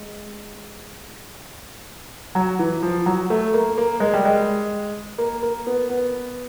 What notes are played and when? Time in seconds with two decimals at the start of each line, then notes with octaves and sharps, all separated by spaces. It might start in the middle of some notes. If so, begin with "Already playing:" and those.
Already playing: G#3
2.35 F#3
2.59 E3
2.83 F3
3.06 F#3
3.30 A3
3.54 A#3
3.78 A#3
4.00 G#3
4.13 G3
4.25 G#3
5.18 A#3
5.43 A#3
5.67 B3
5.90 B3